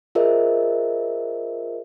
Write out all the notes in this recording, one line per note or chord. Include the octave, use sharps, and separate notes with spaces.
F4 G#4 A#4 C5 D#5 E5